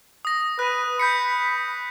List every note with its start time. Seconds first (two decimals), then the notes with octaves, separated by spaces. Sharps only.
0.25 D#6 A#6
0.59 B4 F#6 D#7
1.00 B5 G6 B6 C#7